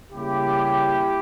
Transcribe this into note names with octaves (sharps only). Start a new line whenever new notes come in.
C#3 G3 A#3 E4 G4